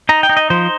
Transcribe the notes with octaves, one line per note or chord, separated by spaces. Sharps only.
D#4 A#5
G5
D#4
D#5
F3 C5